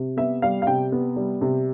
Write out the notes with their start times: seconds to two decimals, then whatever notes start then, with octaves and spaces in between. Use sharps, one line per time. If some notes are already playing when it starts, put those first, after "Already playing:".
Already playing: C3
0.17 B3 E5
0.42 G3 F5
0.62 F5
0.67 C3 G5
0.92 B3
1.16 G3
1.41 C3